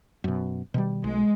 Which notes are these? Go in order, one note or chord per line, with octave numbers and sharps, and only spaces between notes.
F#2 B2
B2 D#3 G3
B1 G#3